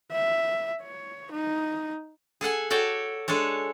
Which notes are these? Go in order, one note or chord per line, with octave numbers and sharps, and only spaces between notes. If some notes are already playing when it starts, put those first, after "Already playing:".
E5
C#5
D#4
G#4 A4 F#5 G#5
F#4 A4 C#5 D5 G5
G#3 D4 A4 C#5